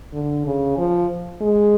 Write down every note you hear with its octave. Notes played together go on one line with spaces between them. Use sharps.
D3
C#3
F3
G#3